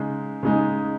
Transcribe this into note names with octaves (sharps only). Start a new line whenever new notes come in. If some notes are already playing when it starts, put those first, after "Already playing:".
Already playing: C#3 G#3 D#4
C#3 G#3 D#4